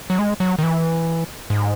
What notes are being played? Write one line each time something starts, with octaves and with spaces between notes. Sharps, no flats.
F#3
G#3
F#3
D#3
E3
G#2